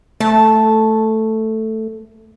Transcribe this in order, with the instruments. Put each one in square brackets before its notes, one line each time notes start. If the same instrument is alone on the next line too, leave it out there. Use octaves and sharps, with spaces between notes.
[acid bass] A3 [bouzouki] A5